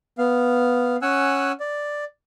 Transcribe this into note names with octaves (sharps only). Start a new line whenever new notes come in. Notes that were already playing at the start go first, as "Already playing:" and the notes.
B3 F5
C#4 F#5 G#5 E6 F#6
D5